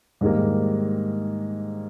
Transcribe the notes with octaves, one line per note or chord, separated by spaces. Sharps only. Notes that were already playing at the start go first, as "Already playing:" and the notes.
G#2 D#3 G3 A#3